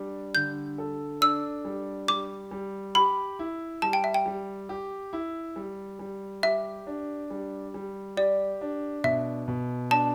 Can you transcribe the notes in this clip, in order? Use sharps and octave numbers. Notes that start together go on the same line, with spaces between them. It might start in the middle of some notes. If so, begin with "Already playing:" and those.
Already playing: G3 D4
D3 G6
A4
D4 E6
G3
G3 D6
G3
G4 B5
E4
G3 A5
G5
E5
G5
G3
G4
E4
G3
G3
G4 E5
D4
G3
G3
G4 D5
D4
B2 E5
B2
D4 A5